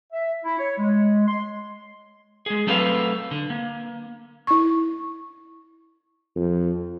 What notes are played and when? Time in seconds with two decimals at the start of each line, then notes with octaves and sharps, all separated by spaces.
0.13 E5
0.44 E4
0.57 C#5
0.78 G#3
1.27 C6
2.46 G#3 G#4
2.67 F#3 A3 C4 A4 B4 F5
3.31 D3
3.50 A#3
4.47 E4 C#6
6.36 F2